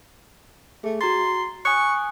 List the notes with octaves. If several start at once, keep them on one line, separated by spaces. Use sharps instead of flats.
A3 G#4
F#4 A#5 C6 A6
G#5 C#6 D#6 F#6